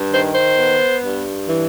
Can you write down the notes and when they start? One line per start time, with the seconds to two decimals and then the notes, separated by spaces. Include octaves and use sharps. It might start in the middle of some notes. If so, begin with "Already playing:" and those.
Already playing: G2
0.12 D#3 C5
0.34 C5
0.57 B3
1.02 G2
1.46 E3